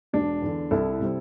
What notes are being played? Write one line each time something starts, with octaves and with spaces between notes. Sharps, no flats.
E1 D4
E2 D3
C2 E4 A4
C3 G3 C4